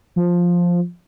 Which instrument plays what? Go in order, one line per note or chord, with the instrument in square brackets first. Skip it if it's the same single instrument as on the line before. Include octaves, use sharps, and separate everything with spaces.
[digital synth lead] F3